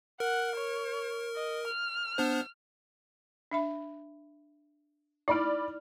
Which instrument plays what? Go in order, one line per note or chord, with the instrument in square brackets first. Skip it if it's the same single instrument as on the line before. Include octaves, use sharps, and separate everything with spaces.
[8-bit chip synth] A#4 [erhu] F#5
[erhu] C#5
D#5
F6
[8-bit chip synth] B3 D4 C5
[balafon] D4 E5 B5
[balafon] D#4 E4 [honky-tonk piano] D5 B5 F6